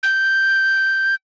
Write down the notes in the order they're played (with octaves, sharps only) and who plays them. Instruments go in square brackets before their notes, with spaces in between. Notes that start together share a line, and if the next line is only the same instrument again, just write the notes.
[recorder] G6